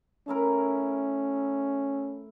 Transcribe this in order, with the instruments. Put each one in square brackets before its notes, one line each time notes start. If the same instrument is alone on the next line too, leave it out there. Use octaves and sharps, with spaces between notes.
[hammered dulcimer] A3 E4 A#4 [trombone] C#4